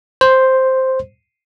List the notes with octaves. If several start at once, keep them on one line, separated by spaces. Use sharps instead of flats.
C5